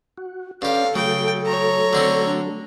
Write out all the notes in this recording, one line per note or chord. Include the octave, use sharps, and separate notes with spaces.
F#4
G2 C#4 G4 A4 F5
C#3 F#3 A3 G5
C#5 A#5
D3 C4 C#4
D4